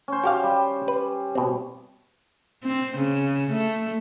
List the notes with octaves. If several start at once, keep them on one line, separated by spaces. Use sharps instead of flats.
C#4 C5
F#4 G4 F5
G3
B4
B2 C4
C4
C#3
A3